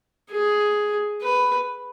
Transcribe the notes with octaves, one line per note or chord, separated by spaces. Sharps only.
G#4
B4